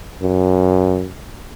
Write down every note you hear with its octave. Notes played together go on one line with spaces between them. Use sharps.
F#2